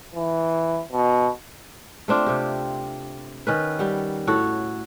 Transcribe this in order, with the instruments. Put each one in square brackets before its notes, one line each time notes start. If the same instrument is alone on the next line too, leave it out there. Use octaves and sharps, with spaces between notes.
[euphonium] E3
B2
[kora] A3 C4 D4 F4
C3 G4
D#3 C#4 B4
G3 F#5
A2 F#4 A4 C#5